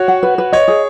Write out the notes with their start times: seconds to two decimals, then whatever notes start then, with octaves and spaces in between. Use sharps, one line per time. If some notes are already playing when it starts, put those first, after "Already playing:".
Already playing: F#4 C#5
0.08 F#5
0.23 B4
0.38 B4
0.52 C#5 D#5
0.68 G#4